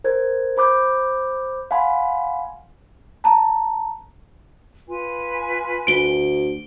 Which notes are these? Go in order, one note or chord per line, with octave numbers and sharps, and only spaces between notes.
A#4 C5 G#6
C5 B5 D6 G6
F5 F#5 G#5 B5 C6
A5 A#5
F4 B4 G#5
D2 D7 G7